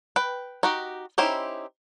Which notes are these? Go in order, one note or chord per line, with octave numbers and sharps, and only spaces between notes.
B4 G5
D#4 F#4 G4
C#4 D#4 E4 G4 C5